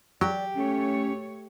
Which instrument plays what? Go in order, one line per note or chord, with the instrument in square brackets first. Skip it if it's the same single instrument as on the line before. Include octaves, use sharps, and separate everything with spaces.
[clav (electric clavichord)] F#3 [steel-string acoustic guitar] G4 [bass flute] D5
[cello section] A3 C#5 [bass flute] C#4